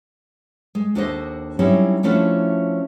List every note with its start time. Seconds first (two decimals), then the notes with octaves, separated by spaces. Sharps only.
0.75 G#3
0.95 D#2 D4 F#4 A4 C5 D#5
1.59 F#3 G3 C4 C#4 D#4 E4
2.03 F3 A3 C#4 D4 E4 F#4